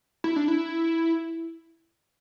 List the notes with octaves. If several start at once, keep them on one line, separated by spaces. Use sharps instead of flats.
E4
D4
E4